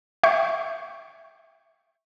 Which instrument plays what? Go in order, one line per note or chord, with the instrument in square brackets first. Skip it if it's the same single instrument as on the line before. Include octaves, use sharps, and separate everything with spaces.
[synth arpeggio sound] E5 G5 C#6